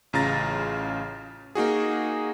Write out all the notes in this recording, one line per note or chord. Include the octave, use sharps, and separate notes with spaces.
A1 C#3 F4 A#5 A6 A#6
A#3 D#4 F#4 G#4